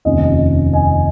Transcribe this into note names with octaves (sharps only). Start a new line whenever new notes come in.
F1 D#2 D#3 C#4 D#5
D#5 G#5